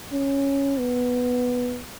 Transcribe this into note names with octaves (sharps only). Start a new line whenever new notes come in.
C#4
B3